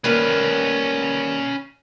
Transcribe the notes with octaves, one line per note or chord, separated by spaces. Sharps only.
D#3 G3 A#3 C#4 B4